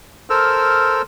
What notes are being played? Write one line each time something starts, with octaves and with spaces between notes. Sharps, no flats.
A4 A#4 C5 E6 F6